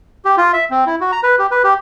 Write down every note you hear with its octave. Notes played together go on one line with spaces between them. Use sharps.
G4
F4
E5
C4
E4
F#4
A#5
B4
G4
B4
G4